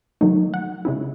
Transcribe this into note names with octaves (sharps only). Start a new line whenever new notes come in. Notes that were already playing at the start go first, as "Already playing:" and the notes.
D#3 F#3 A3 D#4
F#5
C#3 G#3 C#4 E4